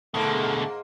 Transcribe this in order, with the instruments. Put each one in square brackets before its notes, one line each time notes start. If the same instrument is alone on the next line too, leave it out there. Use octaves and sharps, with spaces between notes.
[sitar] G#2 A#3 [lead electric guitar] B2 D3 [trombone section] A3